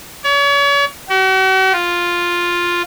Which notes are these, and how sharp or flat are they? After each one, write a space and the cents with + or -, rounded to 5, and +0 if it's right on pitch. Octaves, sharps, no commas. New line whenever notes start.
C#5 +40
F#4 +45
F4 +5